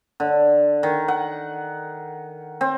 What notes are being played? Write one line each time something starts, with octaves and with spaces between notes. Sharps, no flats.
D3
D#3
F#5
C4